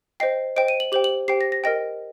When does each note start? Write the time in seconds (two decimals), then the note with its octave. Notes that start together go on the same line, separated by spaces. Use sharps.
0.20 C5 D#5 G5 C7
0.56 C5 D#5 G5 D7
0.68 D#7
0.80 F#7
0.92 G4 C5 G5 F#7
1.04 F#7
1.28 G4 C5 G5 C7
1.41 A#6
1.52 A#6
1.64 A#4 D#5 G5 A#6